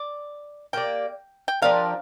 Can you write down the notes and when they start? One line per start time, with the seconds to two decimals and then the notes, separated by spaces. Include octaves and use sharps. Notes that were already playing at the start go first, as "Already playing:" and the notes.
Already playing: D5
0.73 A#3 G4 D5 G5
1.48 G5
1.62 F3 D4 G4 A#4 F5